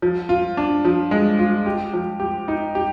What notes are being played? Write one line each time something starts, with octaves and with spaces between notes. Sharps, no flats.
F3
F4
D4
F3
G#3
F4
G4
F3
G4
D#4
G4